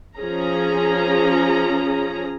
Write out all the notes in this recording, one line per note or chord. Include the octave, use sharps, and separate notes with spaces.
F3 C#4 G#4 A#5